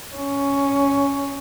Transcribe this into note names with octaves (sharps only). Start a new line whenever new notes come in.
C#4